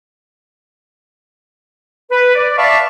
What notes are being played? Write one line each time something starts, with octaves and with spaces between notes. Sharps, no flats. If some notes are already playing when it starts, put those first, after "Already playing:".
B4
D5
D5 E5 F5 A5 B5 C#6